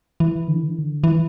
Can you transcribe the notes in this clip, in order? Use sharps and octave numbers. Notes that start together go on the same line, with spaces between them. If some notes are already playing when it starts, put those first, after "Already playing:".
E3
D3
E3
D3
E3
D3
E3